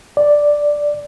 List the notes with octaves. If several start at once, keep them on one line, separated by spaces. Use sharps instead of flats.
D5